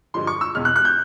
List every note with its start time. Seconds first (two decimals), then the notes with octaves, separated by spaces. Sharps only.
0.14 G2 D3 F3 G#3 C6
0.27 C#6
0.41 E6
0.55 E2 B2 G#3 F6
0.65 F#6
0.76 F#6
0.85 G6